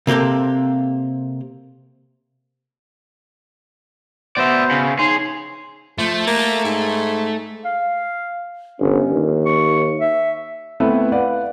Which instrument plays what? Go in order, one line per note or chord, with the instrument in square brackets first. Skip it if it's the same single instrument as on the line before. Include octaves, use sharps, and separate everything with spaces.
[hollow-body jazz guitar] C3 A#3 C4 G4 A4
[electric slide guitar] B3 F#4 [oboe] C5 [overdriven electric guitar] D5 E5
[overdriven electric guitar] C#3
[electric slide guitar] D#4 C#5 [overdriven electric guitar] G#4 [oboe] C6
[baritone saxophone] F3 [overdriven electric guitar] A3
[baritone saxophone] A#3
G#2
[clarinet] F5
[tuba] G1 [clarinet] C#4
[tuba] D#2
[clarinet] C#6
E5
[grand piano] A3 B3 C4 E4 B4 E5
B4 D5 F5 F#5